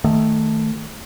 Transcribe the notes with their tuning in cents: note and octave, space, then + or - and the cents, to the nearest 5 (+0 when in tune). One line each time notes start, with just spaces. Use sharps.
D#3 +0 A3 +0